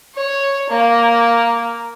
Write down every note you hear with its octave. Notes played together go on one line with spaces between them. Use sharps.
C#5
A#3